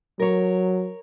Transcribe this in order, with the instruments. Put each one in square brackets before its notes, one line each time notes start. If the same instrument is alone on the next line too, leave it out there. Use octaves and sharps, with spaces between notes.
[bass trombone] F#3 [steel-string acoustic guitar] A#4 C#5